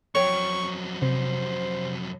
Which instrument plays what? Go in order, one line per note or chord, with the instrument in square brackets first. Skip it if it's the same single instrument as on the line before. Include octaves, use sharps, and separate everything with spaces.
[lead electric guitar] F2 F#3 [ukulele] C#5 G5 [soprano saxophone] C#6
[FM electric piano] C3 [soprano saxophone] C5